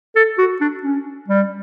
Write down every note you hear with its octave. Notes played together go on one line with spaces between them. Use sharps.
A4
F#4
D4
C#4
G3